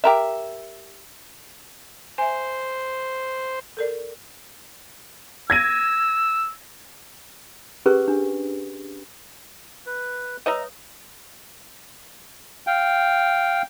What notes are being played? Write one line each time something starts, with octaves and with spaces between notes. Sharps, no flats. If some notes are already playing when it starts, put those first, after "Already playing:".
G4 A#4 E5
C5 E5 G#5
A4 A#4 D5
E6 G#6 A#6 D#7
C#4 G4 G#4 A#4 B4 C#6
D4
B4
B4 C#5 D#5 E5 A#5 D#6
F5 G5